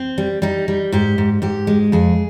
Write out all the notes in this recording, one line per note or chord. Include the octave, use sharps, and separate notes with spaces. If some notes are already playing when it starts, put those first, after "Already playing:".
Already playing: C4
G3
G3 D#4
G3
G#2 G4
G#2
G#2 G4
G#3
F2 G#4